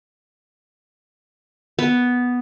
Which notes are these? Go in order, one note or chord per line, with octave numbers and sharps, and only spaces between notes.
B3